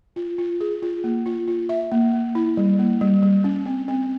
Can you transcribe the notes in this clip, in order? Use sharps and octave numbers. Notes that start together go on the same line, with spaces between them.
F4
F4
G#4
F4
A#3
F4
F4
E5
A#3
A#3
E4
G3
A#3
G3
G3
C#4
C4
C4